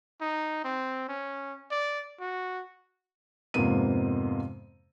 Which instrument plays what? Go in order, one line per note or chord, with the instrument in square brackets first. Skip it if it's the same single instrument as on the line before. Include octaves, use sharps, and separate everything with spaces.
[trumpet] D#4
C4
C#4
D5
F#4
[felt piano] F2 G#2 C3 A#3 B3 D#7